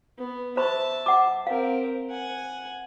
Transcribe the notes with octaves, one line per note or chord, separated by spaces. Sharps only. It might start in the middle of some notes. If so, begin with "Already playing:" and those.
B3
C5 E5 A5 B5 C#6
F#5 D6
C4 A#4 F5
F#5 G#5